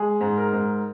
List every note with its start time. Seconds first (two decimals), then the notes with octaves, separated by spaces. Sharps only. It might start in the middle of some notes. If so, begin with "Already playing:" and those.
Already playing: G#3 G#4
0.21 G#2
0.37 A#4
0.53 G#2